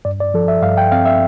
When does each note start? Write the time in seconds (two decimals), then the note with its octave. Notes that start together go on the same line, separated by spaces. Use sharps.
0.05 G2 D5
0.20 D5
0.34 F3 A4
0.48 E5
0.62 G2 F5
0.78 G5
0.92 C4 F5
1.06 E5